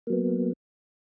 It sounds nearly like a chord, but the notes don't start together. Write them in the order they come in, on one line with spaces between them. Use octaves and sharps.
A#3 F#3 B3